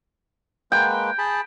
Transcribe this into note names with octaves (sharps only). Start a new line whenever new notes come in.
G#3 A#3 B4 G5
G#4 A5 B5